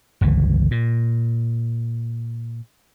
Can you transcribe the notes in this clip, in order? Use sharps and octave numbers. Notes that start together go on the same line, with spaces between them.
G1 C#2 E3
A#2